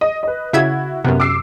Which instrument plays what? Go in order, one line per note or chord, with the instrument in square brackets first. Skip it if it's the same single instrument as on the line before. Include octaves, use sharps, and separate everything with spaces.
[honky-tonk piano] D#5
B4 D#5
[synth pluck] C#3 E5 G#6 [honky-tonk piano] E4 F#4
[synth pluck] F#2 C3 [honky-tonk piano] B3
[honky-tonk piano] D6 E6 C7